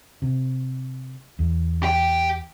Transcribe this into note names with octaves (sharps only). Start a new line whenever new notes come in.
C3
E2
G4 G5